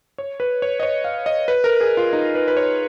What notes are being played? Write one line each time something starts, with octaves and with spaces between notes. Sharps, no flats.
C#5
B4
C#5
D#5
C#5
F5
D#5
B4
A#4
G#4
F4
D#4
B4
B4
C#5